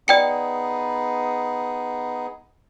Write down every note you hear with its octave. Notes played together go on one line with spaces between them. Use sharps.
B3 D#4 G#4 D5 G5 C#7